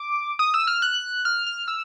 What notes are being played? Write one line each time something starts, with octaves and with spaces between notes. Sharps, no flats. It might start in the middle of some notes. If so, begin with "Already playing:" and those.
Already playing: D6
D#6
E6
F6
F#6
F6
F6
E6